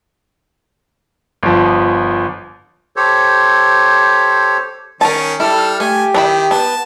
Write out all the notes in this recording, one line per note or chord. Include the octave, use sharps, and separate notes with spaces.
G1 F3
G4 A4 C5 C#5
D#3 C#4 A#4 A5
G3 E4 A4 F6
A3 G4 G#5
D#3 D4 E4 B5
B3 A5